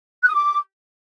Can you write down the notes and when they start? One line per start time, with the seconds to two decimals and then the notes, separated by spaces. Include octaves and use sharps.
0.23 F#6
0.28 D#6
0.34 D6